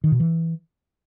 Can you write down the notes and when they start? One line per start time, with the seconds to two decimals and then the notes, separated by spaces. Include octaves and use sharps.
0.04 D#3
0.12 B2
0.20 E3